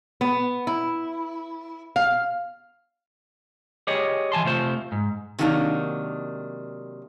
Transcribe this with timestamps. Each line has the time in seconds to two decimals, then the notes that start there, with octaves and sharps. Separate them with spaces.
0.21 B3
0.67 E4
1.96 F5
3.87 G4 G#4 C#5 D#5
4.32 E3 G#5 A5 C6
4.45 C3 A3 F4 C5
4.92 G#2
5.39 C3 D#3 F#3 A#3 D4 D#4